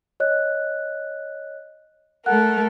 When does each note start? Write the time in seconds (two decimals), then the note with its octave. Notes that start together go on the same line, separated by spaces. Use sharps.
0.20 C#5 D#5 F#6
2.26 A3 A4 A#4 F#5 F#6